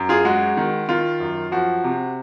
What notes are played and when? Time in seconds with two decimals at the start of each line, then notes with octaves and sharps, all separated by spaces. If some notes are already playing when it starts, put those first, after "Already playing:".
Already playing: F#2
0.09 F4 G#4
0.25 G#3 F#4
0.57 D#3
0.89 D#3 F4
1.20 F#2
1.52 F3 F#4
1.84 C3